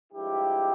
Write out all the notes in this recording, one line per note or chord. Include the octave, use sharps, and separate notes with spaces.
G2 F3 G#3 E4 G4